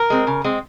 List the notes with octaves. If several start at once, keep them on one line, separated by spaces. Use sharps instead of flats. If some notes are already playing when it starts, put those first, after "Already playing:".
Already playing: A#4
G#3 C4
C#3
G#3 C4